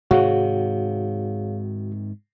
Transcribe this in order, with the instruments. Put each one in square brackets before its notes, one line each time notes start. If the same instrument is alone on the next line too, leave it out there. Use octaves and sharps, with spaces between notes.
[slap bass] G#2 C3 D#3 [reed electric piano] F#4 [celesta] G#4 C#5 F5